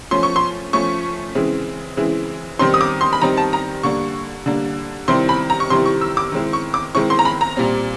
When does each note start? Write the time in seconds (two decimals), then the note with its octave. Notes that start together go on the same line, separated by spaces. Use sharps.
0.11 F3 A3 C#4 C6
0.23 C#6
0.36 C6
0.73 F3 A3 C#4 C#6
1.35 C#3 E3 G#3 C4 E4
1.97 C#3 E3 G#3 C4 E4
2.59 D#3 G3 C4 D#4 C6
2.74 D#6
2.81 D6
3.01 C6
3.13 B5
3.22 D#3 G3 C4 D#4 A#5
3.37 A5
3.53 A#5
3.83 D3 G3 A#3 D4 C#6
4.46 D3 G3 A#3 D4
5.08 C3 D#3 G3 C4 E4 C6
5.29 B5
5.50 A#5
5.60 C#6
5.70 C3 D#3 G3 C4 E4 C6
5.86 C#6
6.01 E6
6.17 D6
6.32 D#3 G#3 C4 E4
6.53 C#6
6.74 D6
6.95 D#3 G#3 C4 E4 C#6
7.10 C6
7.19 A#5
7.25 B5
7.41 A#5
7.57 A#2 G3 C4